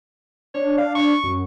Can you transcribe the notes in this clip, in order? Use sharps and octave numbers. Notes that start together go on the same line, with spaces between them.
D4 C#5
F5
C#6
F#2